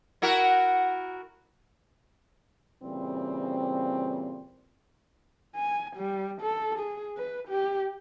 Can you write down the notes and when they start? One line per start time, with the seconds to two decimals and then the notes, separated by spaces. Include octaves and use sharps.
0.22 E4 F#4 A#4
2.82 A#2 C#3 E3 G3 C4
5.56 G#5
5.97 G3
6.42 A4
6.79 G#4
7.17 B4
7.49 G4